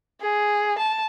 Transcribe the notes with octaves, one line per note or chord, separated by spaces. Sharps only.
G#4
A5